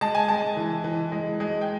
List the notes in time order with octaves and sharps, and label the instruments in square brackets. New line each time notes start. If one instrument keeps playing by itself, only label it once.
[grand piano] G#3 A5
G#5
G#3 A5
E3
E3
G#3
G#3
G5